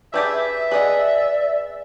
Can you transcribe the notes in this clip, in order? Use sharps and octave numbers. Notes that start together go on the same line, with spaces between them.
D4 G4 G#4 B4 E5 A5
G#4 B4 D5 D#5 F#5